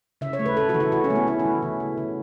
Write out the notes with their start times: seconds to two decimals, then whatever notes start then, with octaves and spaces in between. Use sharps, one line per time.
0.21 C#3 E5
0.33 C#5
0.39 A3
0.45 B4
0.57 C#3 A4
0.69 E3 F#4
0.80 E4
0.92 C#3 F#4
1.04 C#4
1.10 A3
1.15 B3
1.27 C#3 C#4
1.40 E4
1.45 E3
1.63 C#3
1.80 A3
1.98 C#3